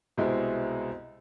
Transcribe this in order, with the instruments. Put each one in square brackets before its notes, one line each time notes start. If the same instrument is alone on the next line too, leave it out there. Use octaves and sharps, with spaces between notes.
[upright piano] C2 B2 G#3 C4 E4